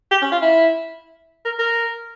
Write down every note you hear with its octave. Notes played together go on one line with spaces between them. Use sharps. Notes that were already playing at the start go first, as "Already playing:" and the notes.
G4
C#4
F4
E4
A#4
A#4